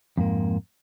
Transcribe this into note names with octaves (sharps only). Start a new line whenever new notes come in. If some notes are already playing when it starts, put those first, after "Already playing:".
F2 G#2 A#3